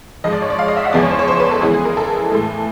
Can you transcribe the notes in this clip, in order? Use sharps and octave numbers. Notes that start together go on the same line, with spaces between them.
G#2 F3 G#3 D#5
D5
C#5
D5
F5
D#5
E5
F#5
E2 C#3 F3 G#3 B3 D5
C#5
C5
C#5
C5
B4
A4
C#3 E3 G#3 B3 G#4
G#4
A#4
A4
A2 E3 A3